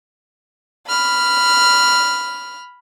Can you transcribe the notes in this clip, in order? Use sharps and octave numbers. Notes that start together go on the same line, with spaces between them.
B5 F6